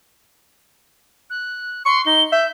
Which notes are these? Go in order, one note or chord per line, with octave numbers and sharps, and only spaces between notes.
F#6
C6 C#6
D#4 G7
E5 G6